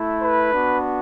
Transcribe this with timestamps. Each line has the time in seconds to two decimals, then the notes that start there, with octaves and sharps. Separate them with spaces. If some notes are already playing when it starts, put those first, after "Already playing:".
Already playing: A3 E4
0.20 B4
0.52 B3 D4 F#4